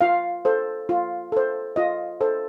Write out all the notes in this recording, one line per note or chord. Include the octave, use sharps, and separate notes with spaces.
F4 F5
A4 C5
F4
A4 C5
F4 D#5
A4 C5